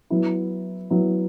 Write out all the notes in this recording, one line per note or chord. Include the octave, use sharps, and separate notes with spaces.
F#3 B3 E4
F#3 B3 E4